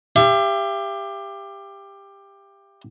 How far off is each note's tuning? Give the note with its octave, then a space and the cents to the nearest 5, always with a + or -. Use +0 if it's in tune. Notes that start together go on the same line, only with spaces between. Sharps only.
G4 +15 E5 +45